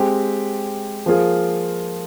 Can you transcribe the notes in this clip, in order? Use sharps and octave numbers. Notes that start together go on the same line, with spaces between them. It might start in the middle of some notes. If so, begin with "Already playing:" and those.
Already playing: G#3 C4 G4
F3 A#3 F4 G#4